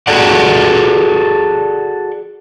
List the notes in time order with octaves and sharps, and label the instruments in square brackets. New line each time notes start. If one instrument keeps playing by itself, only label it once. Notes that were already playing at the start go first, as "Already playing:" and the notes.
[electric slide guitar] F#4 G#4 A4 D5 F#5